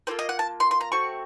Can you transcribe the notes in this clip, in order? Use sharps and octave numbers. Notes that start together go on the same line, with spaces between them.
A#3 F4 A4 C5
D#5
F#5
A5
C6
C6
A#5
A3 C4 F#4 C#6